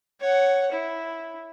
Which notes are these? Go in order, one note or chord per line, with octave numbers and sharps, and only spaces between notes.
C#5 F#5
E4